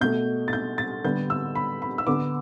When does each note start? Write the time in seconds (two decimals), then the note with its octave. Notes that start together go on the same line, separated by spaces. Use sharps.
0.01 B2 A3 G6
0.48 A6
0.53 G6
0.78 A6
1.04 D3 G3 B3 G6
1.30 E6
1.55 B5
1.82 B5
1.98 E6
2.07 D3 B3 D6